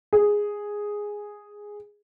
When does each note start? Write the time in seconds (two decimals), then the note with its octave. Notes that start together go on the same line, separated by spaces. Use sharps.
0.13 G#4